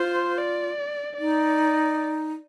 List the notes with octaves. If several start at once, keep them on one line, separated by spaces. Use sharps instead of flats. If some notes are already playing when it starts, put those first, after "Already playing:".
Already playing: F4 C5
D5
D#4 D5